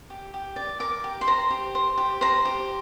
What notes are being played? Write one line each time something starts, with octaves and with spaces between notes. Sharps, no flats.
G4
G4
D5
A#4 D6
G4
C6
C5 A#5
G4
C5
G4
C5 A#5
G4